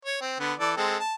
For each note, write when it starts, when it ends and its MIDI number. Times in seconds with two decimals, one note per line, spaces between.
0.05 0.19 73
0.21 0.37 60
0.40 0.53 50
0.40 0.53 59
0.60 0.72 52
0.60 0.72 69
0.60 0.72 74
0.77 0.97 56
0.77 0.97 60
0.77 0.97 69
1.00 1.15 81